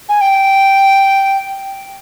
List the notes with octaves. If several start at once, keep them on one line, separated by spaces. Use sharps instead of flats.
G#5
G5